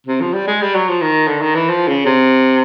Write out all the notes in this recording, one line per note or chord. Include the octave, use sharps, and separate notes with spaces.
C3
F3
G3
G#3
G3
F#3
F3
D#3
D3
D#3
E3
F3
C#3
C3